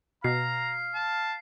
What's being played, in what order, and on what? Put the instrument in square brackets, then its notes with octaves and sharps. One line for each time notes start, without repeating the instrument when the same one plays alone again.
[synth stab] B2 [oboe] F5 [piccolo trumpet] A#5 [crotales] C7
[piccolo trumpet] A5